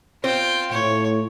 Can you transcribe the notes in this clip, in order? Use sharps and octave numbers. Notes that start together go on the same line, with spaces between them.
C4 F4 C5 G5
A2 C#5